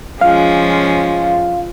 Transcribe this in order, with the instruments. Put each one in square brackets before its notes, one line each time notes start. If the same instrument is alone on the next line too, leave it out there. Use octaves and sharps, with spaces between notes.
[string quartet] F3 G#3 C#4 [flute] F4 [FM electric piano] F5